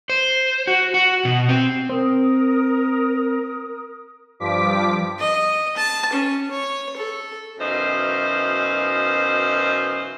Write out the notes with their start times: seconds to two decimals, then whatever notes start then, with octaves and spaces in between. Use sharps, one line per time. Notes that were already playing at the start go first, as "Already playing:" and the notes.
0.10 C5
0.67 F#4
0.94 F#4
1.25 B2
1.49 C4
1.89 C4 A#4 D#6
4.40 G2 F3 D6 B6
5.19 D#5
5.77 A5
6.13 C#4
6.51 C#5
6.96 A4
7.59 F#2 B2 E3 D#4 C5 F5